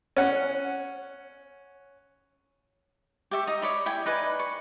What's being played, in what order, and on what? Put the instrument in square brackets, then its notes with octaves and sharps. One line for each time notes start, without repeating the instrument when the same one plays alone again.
[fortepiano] C#4 F#5
[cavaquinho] G4 E5 C#6
D#4 D#6
C#5 D5 B5
E4 G5 G#5
D#4 B4 D5 G#5
C#6